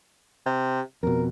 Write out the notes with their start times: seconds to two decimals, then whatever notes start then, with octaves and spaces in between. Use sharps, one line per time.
0.46 C3
1.03 F2 B2 A#4